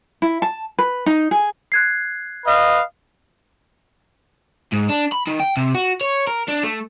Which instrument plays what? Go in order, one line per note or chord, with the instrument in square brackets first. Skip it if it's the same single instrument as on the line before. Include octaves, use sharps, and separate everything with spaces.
[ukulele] E4
A5
B4
D#4
G#4
[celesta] F#6 G#6 C7
[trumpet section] B4 D#5 F5
[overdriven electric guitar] G#2
D4
B5
D#3
G5
C3
F#4
C#5
A#4
D4
A3